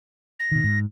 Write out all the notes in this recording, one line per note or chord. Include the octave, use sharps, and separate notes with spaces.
A#6
B2 D#3
G#2